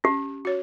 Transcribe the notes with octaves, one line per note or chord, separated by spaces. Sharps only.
C#4 G4
F#4 C#5